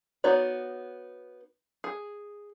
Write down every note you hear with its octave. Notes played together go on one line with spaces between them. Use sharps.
B3 D#4 F#4 C#5 D5
G#4